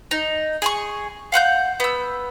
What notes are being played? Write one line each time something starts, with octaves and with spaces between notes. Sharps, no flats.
D#4
G#4 G#5 C#6
F5 F#5 F#6 G6
B3 E6